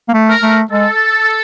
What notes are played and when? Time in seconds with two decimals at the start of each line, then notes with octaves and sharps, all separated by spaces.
0.08 A#3
0.14 A3
0.28 A#4
0.43 A3
0.71 G#3 A4